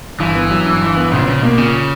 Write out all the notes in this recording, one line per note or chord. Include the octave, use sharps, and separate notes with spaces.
G1 E3
B3
F#3
G2
G1
B3
A#1 C#3
A#1 C#3
B2 A#3
A#2 C#3